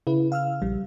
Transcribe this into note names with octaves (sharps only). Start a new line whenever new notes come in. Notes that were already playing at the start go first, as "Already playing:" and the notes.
C#3 E4 B4
F5 E6 F6
A#1 G3